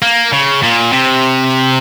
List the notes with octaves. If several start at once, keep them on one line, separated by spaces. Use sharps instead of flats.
A#3
C#3
A#2
C3